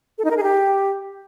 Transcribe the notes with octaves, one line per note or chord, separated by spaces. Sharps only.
A4
D#4
A#4
G#4
G4